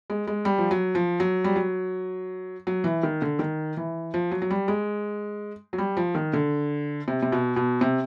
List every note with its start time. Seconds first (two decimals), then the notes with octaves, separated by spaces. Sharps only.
0.10 G#3
0.27 G#3
0.45 G3
0.58 F3
0.71 F#3
0.95 F3
1.20 F#3
1.44 G3
1.56 F#3
2.67 F#3
2.84 E3
3.03 D#3
3.22 D3
3.39 D#3
3.77 E3
4.14 F3
4.31 F#3
4.42 F#3
4.50 G3
4.68 G#3
5.73 F#3
5.78 G3
5.97 F3
6.15 D#3
6.33 D3
7.08 C3
7.23 C3
7.32 B2
7.56 B2
7.81 C3